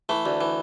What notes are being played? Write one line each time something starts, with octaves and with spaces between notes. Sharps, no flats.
E3 A3
D2
E3